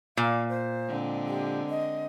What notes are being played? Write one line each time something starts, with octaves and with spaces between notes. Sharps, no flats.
A#2 F5
C5
D3 G#3 C4
G4
D#5